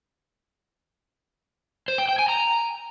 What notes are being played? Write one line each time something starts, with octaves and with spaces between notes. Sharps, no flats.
C5
G5
G5
G#5
A#5